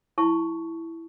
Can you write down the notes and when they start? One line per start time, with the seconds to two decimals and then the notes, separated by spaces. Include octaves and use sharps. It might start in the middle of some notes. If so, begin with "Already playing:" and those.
0.18 E4 A5 C#6